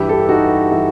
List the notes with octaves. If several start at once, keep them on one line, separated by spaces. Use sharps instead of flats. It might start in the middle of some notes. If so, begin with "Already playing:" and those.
Already playing: G2 E3 E4 G4
A4
G4
D#4 F#4
E3 E4